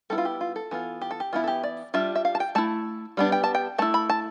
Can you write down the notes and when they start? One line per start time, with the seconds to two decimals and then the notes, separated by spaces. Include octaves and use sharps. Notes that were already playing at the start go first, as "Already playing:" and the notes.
0.10 G3 B3 E4 A4
0.18 F4
0.25 G4
0.41 F4
0.56 A4
0.71 E3 B3 F4
1.02 G4
1.11 A4
1.20 G4
1.33 E3 B3 E4 F4
1.44 A4
1.48 G4
1.63 D5
1.94 G3 D4 F4 E5
2.15 E5
2.25 F5
2.35 A5
2.40 G5
2.55 A3 E4 A5
3.17 G3 B3 D4
3.32 G5
3.44 A5
3.55 G5
3.78 A3 E4 A5
3.94 B5
4.09 A5